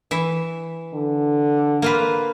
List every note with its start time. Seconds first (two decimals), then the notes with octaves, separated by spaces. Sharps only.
0.11 E3 E5
0.94 D3
1.82 A#3 F4 B4